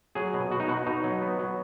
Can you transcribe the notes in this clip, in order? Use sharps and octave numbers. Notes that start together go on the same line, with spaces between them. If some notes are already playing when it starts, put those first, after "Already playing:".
F#3 G#4
B2
B2 F#4
D#4
B2 F#4
B2 D#4
F#3
B3
F#3